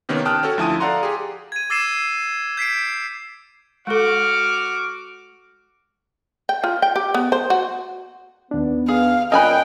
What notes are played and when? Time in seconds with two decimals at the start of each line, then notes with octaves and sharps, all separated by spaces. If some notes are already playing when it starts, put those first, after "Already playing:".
0.09 C3 D#3 A#3 B3 C#4
0.25 G5 A5 D#6 F6 F#6
0.43 C#4 F#4 A4 C#5
0.58 D2 F3 E4 A5 D#6 D#7
0.80 A4 D5 F5 F#5 A#5 C6
1.03 G4 G#4
1.52 G#6 D#7
1.70 D6 E6 A6 C7 D#7 E7
2.57 G6 B6 C7 D7
3.87 G#3 F#4 A4 D6 F6
6.49 G5
6.64 F4
6.82 G5
6.96 G4
7.14 B3
7.32 C5
7.50 F#4
8.51 D#2 B3 D4
8.89 G#4 F5
9.32 A#2 C#4 D#5 G5 G#5 B5 F#6